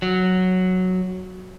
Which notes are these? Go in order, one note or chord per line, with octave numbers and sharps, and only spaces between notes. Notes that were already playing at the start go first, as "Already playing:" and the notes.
F#3